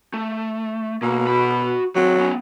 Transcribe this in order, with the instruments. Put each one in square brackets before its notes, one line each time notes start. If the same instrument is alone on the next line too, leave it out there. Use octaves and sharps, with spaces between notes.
[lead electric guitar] A3
[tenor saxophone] B2 [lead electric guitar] A#3
[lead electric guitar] F#4 B5
[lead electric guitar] D#3 C4 [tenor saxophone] F#3
[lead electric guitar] B3 C#4